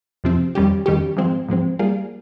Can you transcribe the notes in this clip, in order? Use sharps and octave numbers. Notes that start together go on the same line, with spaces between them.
F2 C3 F3 C4
F2 D#3 G3 C#4 G4
F2 D#3 G3 C#4 G4
G#2 F3 G#3 C4
G#2 F3 G#3 C4
G3 A#3 F4 G#4